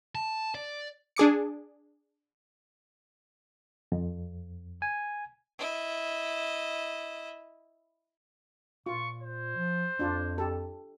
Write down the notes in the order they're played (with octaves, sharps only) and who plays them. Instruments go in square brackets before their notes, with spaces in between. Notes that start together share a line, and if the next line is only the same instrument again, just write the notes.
[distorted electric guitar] A5
D5
[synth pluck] D4 G#4 D6 C#7
[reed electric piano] F2
[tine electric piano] G#5
[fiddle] E4 D#5
[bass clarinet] A#2 [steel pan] F4 [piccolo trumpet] C#6
[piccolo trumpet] C5
[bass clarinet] F3
[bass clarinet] F2 [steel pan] D4 F4
[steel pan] G4 A4